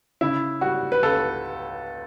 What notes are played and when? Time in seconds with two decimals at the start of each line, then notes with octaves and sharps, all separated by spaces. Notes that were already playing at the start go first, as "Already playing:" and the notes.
0.21 C#3 E4
0.61 G3 F#4
0.92 B4
1.03 C#2 A4